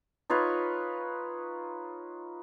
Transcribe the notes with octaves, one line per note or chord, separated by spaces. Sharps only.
D#4 F4 B4 C#5